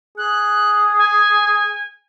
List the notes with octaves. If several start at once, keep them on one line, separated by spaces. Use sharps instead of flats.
G#4 F#6
G#5